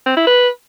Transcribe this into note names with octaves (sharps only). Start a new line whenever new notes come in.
C4
E4
B4